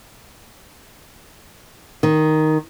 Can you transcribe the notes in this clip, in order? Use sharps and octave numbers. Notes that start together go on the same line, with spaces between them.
D#3